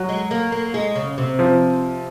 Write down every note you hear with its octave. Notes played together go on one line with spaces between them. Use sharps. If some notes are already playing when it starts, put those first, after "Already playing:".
Already playing: F#3
G#3
A#3
A#3
G#3
C#3
C3
F3